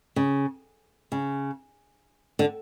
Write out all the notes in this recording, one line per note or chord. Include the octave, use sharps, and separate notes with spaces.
C#3
C#3
D3